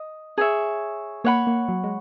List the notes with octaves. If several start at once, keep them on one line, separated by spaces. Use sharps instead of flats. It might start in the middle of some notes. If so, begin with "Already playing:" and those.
Already playing: D#5
G#4 C#5 E5
A#3 C#5 F#5 B5
A#3
F#3
G#3